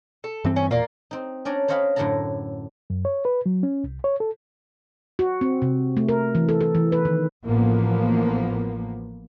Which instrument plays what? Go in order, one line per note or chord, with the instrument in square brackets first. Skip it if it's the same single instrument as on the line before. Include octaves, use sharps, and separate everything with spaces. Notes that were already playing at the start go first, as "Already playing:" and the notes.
[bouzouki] A4
[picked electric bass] G2 E3 C4
[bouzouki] C#4
[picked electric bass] E1 A#2 [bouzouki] A#3 D5
[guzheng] C4 D#4
C#4 D4 D5 G#5 A#5
C5 C#5 D#5 F5 G5 B5
F#2 A2 D3 A4 A5 A#5
[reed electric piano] F#2
C#5
B4
F#3
C#4
C2
C#5
A4
[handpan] F#4
C4
C3
A3
A#4
E3
A4
A4
E3
B4
D#3
[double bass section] A1 F3 A#3 B3